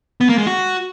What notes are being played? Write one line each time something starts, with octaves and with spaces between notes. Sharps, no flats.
B3
A#3
G#3
F#4